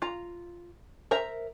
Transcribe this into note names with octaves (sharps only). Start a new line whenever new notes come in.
F4 A#5
A#4 C5 E5 A#5